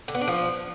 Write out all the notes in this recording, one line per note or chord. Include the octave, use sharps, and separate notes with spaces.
D3
B3
D4
F3